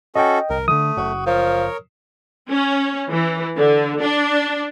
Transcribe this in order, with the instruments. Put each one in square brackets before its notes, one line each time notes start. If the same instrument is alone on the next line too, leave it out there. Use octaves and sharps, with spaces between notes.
[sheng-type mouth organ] C#4 F#4 A4 [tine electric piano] D#5 G5
[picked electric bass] C2 [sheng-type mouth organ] A#4
[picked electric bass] D3 E3 [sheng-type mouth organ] A3 [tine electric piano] D#6
[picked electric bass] F#1 [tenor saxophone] F#4
[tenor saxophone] F3 [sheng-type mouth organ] A#4 C#5
[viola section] C#4
E3
D3
D4